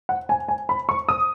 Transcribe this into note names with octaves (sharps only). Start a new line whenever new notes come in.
F#5
G#5
G#5
B5
C#6
D#6